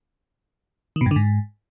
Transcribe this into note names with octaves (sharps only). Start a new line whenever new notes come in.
D#3
B2
G2
D3
G#2